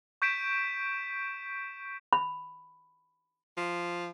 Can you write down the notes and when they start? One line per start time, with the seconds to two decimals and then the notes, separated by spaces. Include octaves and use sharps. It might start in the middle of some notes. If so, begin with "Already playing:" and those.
0.22 C#6 G6 B6 D7 E7
2.13 B5
3.57 F3